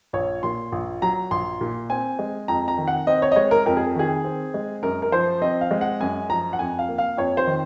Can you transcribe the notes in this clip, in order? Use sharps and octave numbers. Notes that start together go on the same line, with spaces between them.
A#1 C#5
A#2 C6
A#1
F#3 A#5
A#1 C6
A#2
C4 G#5
G#3
F2 A#5
A#5
D#3
F#5
C4 D#5
C#5
D#5
G#3 C#5
A#4
F2 A#4
G#4
D#3 G#4
C4
G#3
F#2 A#4
A#4
F3 C5
C4 D#5
F5
G#3
F#5
F#2 G#5
F3 A#5
F#5
F2 G#5
F5
A#3
F5
F2 C#5
C5
D#3